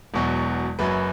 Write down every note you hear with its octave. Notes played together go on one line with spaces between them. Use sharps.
E1 E2 B2 F#3
F#1 F#2 F#3 B4